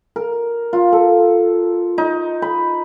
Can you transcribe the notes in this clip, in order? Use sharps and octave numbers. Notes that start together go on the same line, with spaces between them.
A#4
F4
A4
D#4
B5